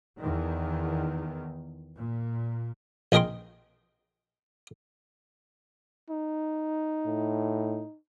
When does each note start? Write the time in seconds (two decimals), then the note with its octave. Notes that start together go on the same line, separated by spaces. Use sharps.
0.18 E2 D#3
1.96 A#2
3.12 A#1 D#4 G#4 A#4 G5 C6
6.10 D#4
7.06 A2